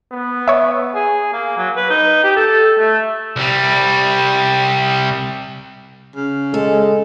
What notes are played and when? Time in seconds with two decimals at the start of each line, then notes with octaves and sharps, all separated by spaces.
0.12 B3
0.48 C#5 E5
0.95 G#4
1.33 A#3
1.57 F#3
1.76 B4
1.90 D#4
2.24 G4
2.36 A4
2.79 A3
3.36 C2 G3
6.16 C#3
6.54 G#3 A4